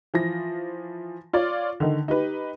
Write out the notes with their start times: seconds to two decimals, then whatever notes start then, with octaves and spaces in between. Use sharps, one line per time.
0.14 E3 F3 A#6
1.33 F4 C#5 D5
1.80 D3 D#3 D#4
2.08 D#4 G4 B4